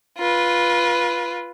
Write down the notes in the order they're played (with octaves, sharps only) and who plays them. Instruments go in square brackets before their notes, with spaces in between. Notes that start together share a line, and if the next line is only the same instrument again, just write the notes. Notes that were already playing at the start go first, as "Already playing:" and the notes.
[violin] F4 B4